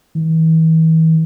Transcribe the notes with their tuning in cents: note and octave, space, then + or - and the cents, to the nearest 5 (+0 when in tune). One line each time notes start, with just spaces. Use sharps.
E3 -40